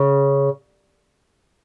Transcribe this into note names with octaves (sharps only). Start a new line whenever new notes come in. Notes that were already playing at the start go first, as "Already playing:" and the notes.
Already playing: C#3